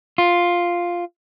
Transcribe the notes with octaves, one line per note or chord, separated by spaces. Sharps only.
F4